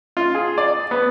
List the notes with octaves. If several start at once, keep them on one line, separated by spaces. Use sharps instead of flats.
F4
G#4
D5
B3